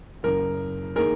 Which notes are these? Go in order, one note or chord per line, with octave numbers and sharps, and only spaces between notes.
F#1 F#2 C#3 A#4
D#3 A#3 D#4 G#4 A#4